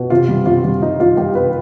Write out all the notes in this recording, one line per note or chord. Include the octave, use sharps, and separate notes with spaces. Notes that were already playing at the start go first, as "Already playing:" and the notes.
Already playing: B2
C3 F4
G3
C3 F4
G3
G3 D#4
G3 F4
G3 G4
C3 B4